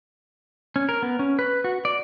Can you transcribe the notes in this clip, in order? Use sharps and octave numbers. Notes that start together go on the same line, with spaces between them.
C#4
A#4
B3
C#4
B4
F#4
D5